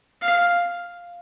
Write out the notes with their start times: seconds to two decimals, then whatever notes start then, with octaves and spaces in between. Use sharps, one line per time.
0.21 F5